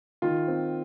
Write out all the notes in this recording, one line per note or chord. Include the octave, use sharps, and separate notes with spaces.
D#3 F4
C4